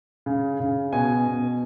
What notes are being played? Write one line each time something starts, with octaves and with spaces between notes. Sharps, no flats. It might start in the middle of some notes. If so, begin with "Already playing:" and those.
C#3
C#3
B2 G#5
B2